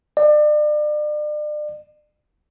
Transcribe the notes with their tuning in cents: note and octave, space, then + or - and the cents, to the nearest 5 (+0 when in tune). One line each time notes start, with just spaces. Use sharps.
D5 +35